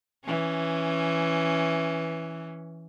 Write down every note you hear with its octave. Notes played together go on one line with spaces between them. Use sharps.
E3 C#4